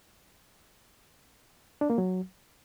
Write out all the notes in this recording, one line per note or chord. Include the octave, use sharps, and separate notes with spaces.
D4
A#3
F#3